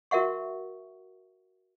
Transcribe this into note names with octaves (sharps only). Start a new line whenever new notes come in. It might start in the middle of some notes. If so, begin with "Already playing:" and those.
F#4 A#4 E5 F#5 C#6